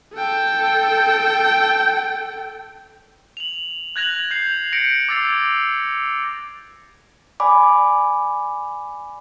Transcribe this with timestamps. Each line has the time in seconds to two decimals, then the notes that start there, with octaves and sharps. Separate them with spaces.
0.15 A4 G5
3.37 F7 F#7
3.96 F#6 G#6 A#6 F7 F#7
4.31 G6 C7 F7
4.72 G6 A#6 C#7 D7
5.09 D6 E6 G#6 A6 C7 F7
7.40 D5 G#5 B5 D6